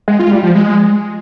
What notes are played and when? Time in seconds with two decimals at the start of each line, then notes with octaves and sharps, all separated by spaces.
0.08 G#3
0.20 F4
0.31 G3
0.43 F3
0.55 G#3